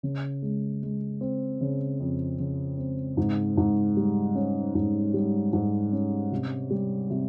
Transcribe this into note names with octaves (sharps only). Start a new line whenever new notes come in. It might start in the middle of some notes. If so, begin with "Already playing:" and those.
C#3
G#3
G#3
C4
C#3
F2
C#3
C4
G#2
G#2
G3
C#4
G#2
G3
G#2
C#4
C3
G3
C3